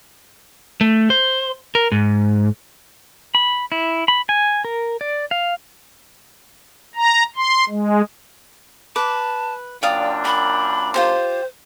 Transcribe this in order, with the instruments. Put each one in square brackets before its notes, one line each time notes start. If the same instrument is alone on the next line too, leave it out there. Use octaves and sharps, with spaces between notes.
[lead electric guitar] A3
C5
A#4
G#2
[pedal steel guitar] B5
E4
B5
G#5
A#4
D5
F5
[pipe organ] A#5
C6
G#3
[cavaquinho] B4 D6 [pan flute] A5
[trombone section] F#2 A#2 D4 [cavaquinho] D5 F5 D#6 [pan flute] G5
[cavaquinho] G5 [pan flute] B5
[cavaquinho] F4 G4 C6 [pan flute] C5